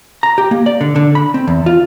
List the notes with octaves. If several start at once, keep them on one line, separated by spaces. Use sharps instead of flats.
A#5
G4
A#3
D5
D3
D3
B5
C4
E2
F4